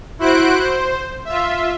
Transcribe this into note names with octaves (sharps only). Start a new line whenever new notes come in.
E4 F#4 C5 F#6 D7
C5
F4 E5